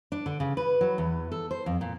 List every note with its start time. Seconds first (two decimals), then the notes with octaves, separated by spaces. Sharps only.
0.12 D4
0.26 D3
0.40 C#3
0.57 B4
0.81 F#3
0.98 E2
1.32 A4
1.51 C5
1.66 F2
1.81 A#2